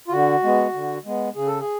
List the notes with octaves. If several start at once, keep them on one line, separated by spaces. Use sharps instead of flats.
F4
D3 F#4
G#3 B3
D3
G#3 B3
C#3 G#4
A4
G#4